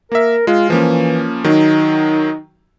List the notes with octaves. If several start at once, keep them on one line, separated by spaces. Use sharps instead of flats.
A#3 A#4 E5
G#3 F4
E3 F3 A#3 C#4
D#3 F#3 D#4